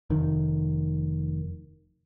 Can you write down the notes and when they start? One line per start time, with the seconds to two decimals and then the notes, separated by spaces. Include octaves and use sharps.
0.10 F1 D#3